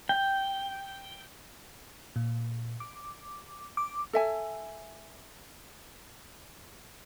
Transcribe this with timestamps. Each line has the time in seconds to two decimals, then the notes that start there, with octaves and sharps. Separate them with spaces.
0.09 G5
2.16 A#2
2.80 D6
3.77 D6
4.13 A4 E5 G#5